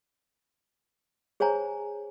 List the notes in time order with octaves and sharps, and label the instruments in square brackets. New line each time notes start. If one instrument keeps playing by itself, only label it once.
[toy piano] G#4 C5 C#5 G#5 A#5